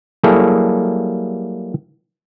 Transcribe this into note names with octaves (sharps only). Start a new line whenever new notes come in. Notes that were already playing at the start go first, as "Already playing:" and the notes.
F#3 G3 A#3 E4 G#4 A4